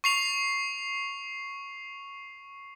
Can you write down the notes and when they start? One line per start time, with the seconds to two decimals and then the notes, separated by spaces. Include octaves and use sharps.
0.04 C#6 C7 F7